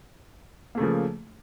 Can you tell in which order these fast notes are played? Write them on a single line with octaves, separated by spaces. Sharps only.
A#3 A3 C#3 F3